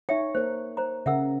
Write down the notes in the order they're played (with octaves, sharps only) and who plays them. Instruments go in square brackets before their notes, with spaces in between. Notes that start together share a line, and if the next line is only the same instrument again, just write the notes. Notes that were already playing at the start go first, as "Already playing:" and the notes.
[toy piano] D#4 E5 G5 [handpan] C#5
[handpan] A#3 A#4 [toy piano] C5
[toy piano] C5 A#5
[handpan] C#3 A#4 [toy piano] E5 F#5 E6